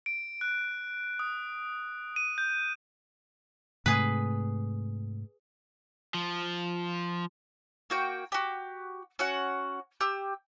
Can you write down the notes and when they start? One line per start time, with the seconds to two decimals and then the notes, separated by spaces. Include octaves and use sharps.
0.06 D7
0.41 F#6
1.19 D#6
2.16 D#7
2.38 G6
3.86 G#2 C3 A3 G#4 B4
6.14 F3
7.90 A#3 F#4 G5
8.32 F#4 G4
9.19 C#4 F#4 F#5
10.01 G4 E6